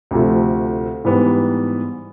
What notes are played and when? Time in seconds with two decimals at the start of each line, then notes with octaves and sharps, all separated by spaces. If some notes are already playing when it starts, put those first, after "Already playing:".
0.11 D2 C3 F3 A3
1.04 G#2 E3 G3 B3